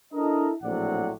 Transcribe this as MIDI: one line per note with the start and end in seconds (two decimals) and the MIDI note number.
0.13 0.49 62
0.13 0.49 64
0.13 0.49 69
0.13 0.49 70
0.13 0.49 75
0.63 1.10 34
0.63 1.10 45
0.63 1.10 54
0.63 1.10 60
0.63 1.10 74
0.63 1.10 78